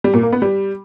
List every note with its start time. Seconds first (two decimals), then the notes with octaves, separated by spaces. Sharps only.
0.04 G3
0.14 A#2
0.23 A#3
0.32 B3
0.42 G3